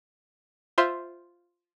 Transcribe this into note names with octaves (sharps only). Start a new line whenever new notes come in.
F4 C5 E5 C6